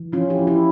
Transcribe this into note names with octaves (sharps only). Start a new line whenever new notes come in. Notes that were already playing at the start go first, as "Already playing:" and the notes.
Already playing: E3
F3 C#4 F4
E4 G4
F3
E4 G4